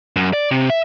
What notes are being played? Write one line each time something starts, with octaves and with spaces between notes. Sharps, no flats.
F#2
D5
C3
E5